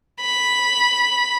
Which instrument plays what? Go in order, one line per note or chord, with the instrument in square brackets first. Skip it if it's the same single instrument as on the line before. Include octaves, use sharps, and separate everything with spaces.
[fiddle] B5